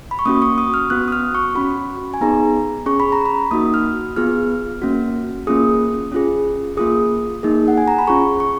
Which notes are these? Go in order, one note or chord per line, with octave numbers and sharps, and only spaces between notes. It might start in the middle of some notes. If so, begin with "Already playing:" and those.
B5
C#6
A#3 C#4 F#4 D#6
C#6
D#6
F6
B3 F#4 F#6
D#6
F6
C#6
C#4 F#4 B5
G#5
B3 D#4 G#4 A#5
C#4 G#4 C#6
B5
A#5
B5
A#3 D#4 F#4 D#6
F6
B3 F4 G#4 F6
A#3 C#4 F#4
A#3 C#4 F4 G#4 D#6
C#4 F4 G#4
A#3 F4 G#4 D#6
A#3 D#4 G#4
F#5
G#5
A#5
B5
C#4 F4 G#4 C#6
C#6